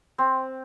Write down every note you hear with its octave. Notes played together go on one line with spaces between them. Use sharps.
C4